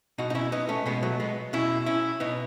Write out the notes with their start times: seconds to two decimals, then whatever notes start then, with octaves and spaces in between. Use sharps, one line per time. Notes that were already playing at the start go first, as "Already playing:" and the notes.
0.18 B2 D#4 F#4
0.30 D#4
0.35 C#4 E4
0.52 B3 D#4
0.69 A3 C#4
0.86 B2 G#3 B3
1.03 F#3 A3
1.20 G#3 B3
1.53 B2 C#4 E4
1.86 C#4 E4
2.20 B2 B3 D#4